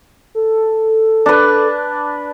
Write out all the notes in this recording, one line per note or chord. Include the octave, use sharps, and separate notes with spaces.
A4
D4 B4